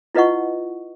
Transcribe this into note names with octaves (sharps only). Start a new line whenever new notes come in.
E4 F4 B4 D#5 F#5 C#6